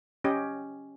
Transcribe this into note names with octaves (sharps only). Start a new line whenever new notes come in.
C#4 G4 D#5